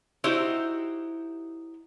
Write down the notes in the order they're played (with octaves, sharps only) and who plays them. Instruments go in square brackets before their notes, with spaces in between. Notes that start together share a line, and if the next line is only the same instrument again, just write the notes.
[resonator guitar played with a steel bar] D#4 E4 F#4 G4 C5 E5